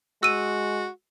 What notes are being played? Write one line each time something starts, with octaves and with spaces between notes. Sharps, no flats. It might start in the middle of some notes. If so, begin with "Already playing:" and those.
G#3 F#4 E6 D#7